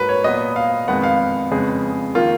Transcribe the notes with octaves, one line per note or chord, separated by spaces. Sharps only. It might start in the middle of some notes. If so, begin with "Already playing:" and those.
Already playing: G#2 F#3 A#3 B4
C#5
A#2 F#3 B3 D#5
F5
F2 D#3 G#3 B3 F#5
F5
F2 C#3 G#3 B3 G#4
D#3 A#3 F4